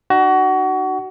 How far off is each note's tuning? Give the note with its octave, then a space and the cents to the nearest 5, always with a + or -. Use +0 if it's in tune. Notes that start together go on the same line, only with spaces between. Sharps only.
D#4 -35 F#4 +25